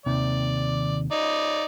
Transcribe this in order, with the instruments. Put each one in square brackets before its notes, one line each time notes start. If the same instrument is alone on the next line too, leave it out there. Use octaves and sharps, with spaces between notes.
[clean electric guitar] D#2 C3 D#3 [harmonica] D5
[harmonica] D#4 D5